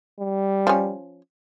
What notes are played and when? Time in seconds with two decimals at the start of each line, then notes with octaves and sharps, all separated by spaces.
0.20 G3
0.67 F3 C#4